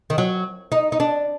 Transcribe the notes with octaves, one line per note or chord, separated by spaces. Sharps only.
D#3
F#3
D#4
D#4
D4